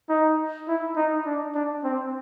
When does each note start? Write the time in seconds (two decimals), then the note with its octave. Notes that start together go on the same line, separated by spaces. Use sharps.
0.10 D#4
0.68 E4
0.97 D#4
1.26 D4
1.55 D4
1.84 C4